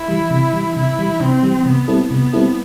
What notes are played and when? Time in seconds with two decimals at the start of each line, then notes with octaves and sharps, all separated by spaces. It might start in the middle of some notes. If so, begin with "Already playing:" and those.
Already playing: E4
0.08 E3 G3
0.31 C3
0.53 E3 G3
0.76 C3 E4
0.99 E3 G3
1.20 C3 C4
1.43 E3 G3
1.66 C3 B3
1.88 G3 C4 E4 A4
2.11 C3 B3
2.33 G3 C4 E4 A4